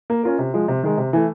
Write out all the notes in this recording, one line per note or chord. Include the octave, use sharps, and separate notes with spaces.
A#3
C#4 F4 A#4
C3
F3 G#3
C3
D#3 G#3
C3
E3 A3